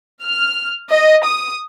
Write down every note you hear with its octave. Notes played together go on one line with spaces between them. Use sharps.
F6
D#5
D#6